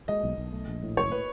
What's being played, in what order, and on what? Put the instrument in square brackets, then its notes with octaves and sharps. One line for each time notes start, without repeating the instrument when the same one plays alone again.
[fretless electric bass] G#3 [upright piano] D#5
[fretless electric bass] B1
B1
A3
A#1
A2
[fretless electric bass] F#1 [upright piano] C#5
[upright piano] B4